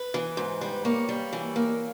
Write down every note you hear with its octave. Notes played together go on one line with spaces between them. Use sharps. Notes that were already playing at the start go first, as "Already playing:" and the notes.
Already playing: B4
E3
G#2
G3
A#3 C#5
G3
E3
A#3